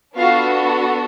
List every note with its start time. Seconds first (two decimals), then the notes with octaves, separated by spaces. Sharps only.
0.16 B3 D4 F4 F#4 A4 F5